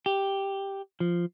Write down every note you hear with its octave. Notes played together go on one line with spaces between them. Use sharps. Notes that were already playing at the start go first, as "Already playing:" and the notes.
G4
F3